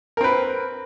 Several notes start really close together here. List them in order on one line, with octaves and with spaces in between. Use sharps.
A#4 C4 B4